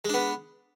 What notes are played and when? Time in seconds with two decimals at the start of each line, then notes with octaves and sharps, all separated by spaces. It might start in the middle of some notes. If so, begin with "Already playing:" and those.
0.05 G#3
0.09 D4
0.14 B3